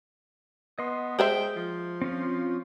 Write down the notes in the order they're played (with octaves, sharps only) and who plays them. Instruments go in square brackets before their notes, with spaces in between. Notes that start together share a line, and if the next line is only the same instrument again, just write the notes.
[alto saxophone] B3 [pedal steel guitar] D#5 C6
[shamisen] G#3 C5 E5 [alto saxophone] G5
[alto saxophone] F3
[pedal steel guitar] C4 C#4 F4